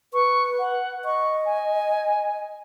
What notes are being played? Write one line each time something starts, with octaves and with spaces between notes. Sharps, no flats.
B4 C#6
F#5
D#5 C#6
G#5